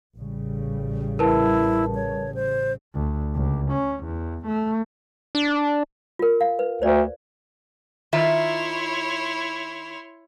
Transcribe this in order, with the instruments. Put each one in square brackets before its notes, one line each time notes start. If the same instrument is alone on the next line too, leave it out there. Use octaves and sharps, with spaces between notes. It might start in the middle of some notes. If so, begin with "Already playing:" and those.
[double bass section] A1 C#3 G3
[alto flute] E4 [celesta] A#4 B4 A5
[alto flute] C#5
C5
[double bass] D2
C#2
C#4
E2
A3
[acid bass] D4
[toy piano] F4 A#4
F5
B4
[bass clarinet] D2 [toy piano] C5 D5
[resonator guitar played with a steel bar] D#3 F4 E5 [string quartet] E4 C#5 C6